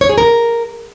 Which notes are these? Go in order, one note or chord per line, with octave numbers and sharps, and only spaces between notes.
C#5
G#4
A#4